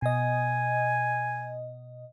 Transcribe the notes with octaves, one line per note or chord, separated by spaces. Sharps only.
B2 D#5 G#5